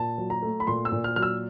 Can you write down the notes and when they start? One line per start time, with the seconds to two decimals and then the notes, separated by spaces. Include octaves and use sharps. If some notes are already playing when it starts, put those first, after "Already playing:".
Already playing: A#2 A5
0.18 F#3
0.30 A#5
0.42 A3
0.60 B5
0.67 A#2 C6
0.85 E6
0.92 A#2
1.04 F6
1.16 F#3 F6
1.22 E6